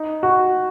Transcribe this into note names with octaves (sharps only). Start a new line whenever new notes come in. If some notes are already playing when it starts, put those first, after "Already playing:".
Already playing: D#4
F#4